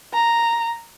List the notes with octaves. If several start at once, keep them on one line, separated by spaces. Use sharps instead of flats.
A#5